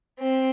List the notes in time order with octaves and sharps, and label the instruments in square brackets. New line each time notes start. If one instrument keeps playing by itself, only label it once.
[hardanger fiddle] C4